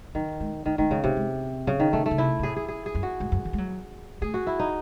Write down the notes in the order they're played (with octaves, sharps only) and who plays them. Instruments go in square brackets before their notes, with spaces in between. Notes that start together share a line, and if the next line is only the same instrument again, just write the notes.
[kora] D#3 [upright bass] F#3
[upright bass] G#3
[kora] D#3 [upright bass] A3
[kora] D#3 [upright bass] A3
[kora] C#3 [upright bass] G#3
[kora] C3 [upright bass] A3
[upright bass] G#3
[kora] C#3 [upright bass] F#3
[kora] D#3
[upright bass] C#3 [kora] A3
[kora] A3
[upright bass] C#3
[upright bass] C3 [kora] E4
[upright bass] C3
[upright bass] A2 [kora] G#4
[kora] G#4
G#4
G#4
[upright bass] F#2
[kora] F#4
[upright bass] G#2
F#2
E3
G#3
F#3
[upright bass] A3 [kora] G#4
[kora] F#4
E4
D#4